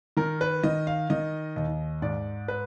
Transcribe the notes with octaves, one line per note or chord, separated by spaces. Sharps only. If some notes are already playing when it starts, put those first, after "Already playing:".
D#3 A#4
B4
D#3 D#5
F5
D#3 D#5
D#2 D#5
G#2 D5
B4